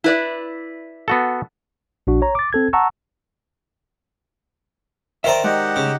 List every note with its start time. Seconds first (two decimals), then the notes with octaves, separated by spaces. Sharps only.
0.04 E4 B4 D5
1.08 B3 F#4 A4
2.07 A#1 D4 F#4
2.22 C#5 A#5
2.35 D6 A6
2.53 C4 A4 G#6
2.73 F#5 A5 A#5 C#6 E6
5.24 D#3 C5 D5 E5 A#5
5.44 G#3 D#4 G4 F#5
5.76 C#3